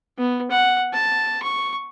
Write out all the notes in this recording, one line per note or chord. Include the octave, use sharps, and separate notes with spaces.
B3
F#5
A5
C#6